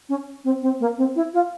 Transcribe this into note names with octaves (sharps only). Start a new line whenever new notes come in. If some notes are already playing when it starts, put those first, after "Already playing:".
C#4
C4
C4
A#3
C4
E4
F4